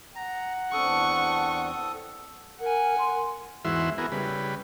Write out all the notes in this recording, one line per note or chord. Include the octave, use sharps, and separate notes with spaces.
F#5 A#5
E2 C4 D4 A4 C#6 D#6
A#4 F#5 G#5
C6
E2 G#2 E3 F#4 E5 C6
B3 E4 F#4 G#4 A#4
C#3 G3 B4